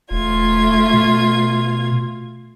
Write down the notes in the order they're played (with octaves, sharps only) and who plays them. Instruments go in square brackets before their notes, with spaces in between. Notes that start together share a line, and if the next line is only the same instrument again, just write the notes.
[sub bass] E1 [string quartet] A3 F4 G#6
[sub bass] B2